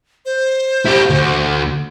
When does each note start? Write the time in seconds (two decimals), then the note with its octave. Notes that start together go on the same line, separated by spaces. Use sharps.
0.26 C5
0.86 E4 G4
1.10 D2